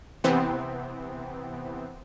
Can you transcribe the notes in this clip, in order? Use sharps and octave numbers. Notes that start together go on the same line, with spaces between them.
C3 E3 B3 C4